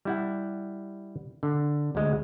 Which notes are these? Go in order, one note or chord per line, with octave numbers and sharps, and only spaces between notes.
G3 E4 F#5
D3
D2 G#3 D#5